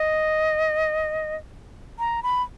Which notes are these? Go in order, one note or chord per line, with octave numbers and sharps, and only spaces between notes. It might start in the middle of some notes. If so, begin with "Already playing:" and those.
Already playing: D#5
A#5
B5